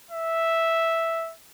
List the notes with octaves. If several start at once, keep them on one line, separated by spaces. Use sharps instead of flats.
E5